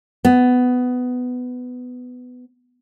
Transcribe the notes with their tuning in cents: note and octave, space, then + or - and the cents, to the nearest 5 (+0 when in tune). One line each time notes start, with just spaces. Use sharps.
B3 +15